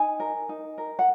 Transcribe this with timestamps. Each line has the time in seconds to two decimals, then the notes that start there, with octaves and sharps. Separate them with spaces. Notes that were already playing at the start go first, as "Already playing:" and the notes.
Already playing: D#4 G#5
0.20 A#4
0.49 D#4
0.78 A#4
0.99 F#5